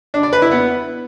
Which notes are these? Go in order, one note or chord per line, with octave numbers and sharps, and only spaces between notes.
D4
D5
B4
E4
B3